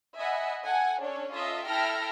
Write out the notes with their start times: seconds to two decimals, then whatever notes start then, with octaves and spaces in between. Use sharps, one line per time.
0.18 D#5 E5 F#5 G#5 B5
0.63 A4 F#5 G#5
1.02 C#4 D4 A4 C#5
1.33 F4 A4 D#5 E5
1.67 E4 A4 E5 G5 F6 A#6